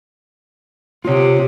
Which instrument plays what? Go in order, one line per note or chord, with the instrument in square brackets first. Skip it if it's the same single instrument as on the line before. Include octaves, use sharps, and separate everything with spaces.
[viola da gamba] C3 [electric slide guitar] F4 C#5